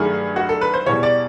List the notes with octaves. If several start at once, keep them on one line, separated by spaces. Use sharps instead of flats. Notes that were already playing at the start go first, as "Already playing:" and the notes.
Already playing: G2 D#3 F#3 A3 G#4
F#4
A4
B4
C5
E2 B2 G3 C#5
D5